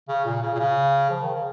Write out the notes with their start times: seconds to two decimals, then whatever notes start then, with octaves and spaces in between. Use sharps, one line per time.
0.08 C#3
0.25 A#2
0.42 C#3
0.54 A#2
0.59 C#3
1.10 F3
1.22 D#3
1.33 C#3